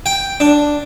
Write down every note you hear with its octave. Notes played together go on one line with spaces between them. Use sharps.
G5
D4